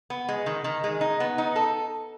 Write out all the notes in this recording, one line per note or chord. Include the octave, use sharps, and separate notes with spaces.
B3
G#3
D#3
D#3
G#3
D#4
B3
D#4
A4